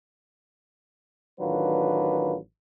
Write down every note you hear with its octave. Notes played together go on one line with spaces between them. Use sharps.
A1 D#3 F#3 D4 F4 B4